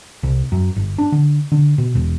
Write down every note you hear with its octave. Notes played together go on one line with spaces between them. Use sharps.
C2
F#2
G1
D4
D3
D3
B2
E1